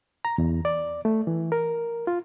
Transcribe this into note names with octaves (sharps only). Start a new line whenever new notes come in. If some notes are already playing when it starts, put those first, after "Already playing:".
A#5
E2
D5
A3
E3
A#4
F4